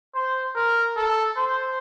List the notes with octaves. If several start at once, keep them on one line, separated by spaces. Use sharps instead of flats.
C5
A#4
A4
C5